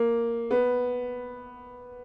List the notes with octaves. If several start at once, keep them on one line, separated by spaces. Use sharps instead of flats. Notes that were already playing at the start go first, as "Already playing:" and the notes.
Already playing: A#3
B3